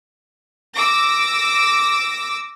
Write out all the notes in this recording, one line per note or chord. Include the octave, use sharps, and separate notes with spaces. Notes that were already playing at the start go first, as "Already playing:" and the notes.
D6 E6 A#6